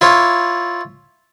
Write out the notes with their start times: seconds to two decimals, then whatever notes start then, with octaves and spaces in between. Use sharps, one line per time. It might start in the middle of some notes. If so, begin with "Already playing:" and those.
0.01 E4 F4 C#5